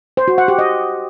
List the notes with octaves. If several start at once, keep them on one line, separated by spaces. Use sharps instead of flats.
C5
F#4
F#5
G4
D#5